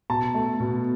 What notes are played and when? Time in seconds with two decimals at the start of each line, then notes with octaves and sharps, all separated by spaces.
0.10 B2 A5
0.34 A3
0.60 B2